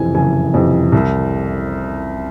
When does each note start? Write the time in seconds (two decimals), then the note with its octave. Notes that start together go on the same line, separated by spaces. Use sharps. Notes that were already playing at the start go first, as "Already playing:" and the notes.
Already playing: F#1 F2 C3 E3 G#5
0.15 F#1 G#5
0.54 F2 C3 E3
0.92 C2